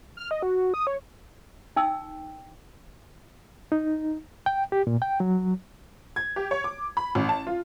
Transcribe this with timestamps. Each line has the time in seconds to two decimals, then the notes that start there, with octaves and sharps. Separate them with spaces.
0.17 F6
0.31 D#5
0.43 F#4
0.74 D#6
0.87 C#5
1.76 D#4 G5 E6
3.72 D#4
4.46 G5
4.72 G4
4.87 A#2
5.02 G5
5.20 F#3
6.16 G#6
6.36 G4
6.51 C#5
6.64 D6
6.97 B5
7.15 A1
7.29 A5
7.47 F4